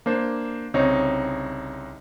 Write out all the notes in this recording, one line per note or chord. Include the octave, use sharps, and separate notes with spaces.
A#3 D4 C5
C2 C#3 C4 D#4 C#5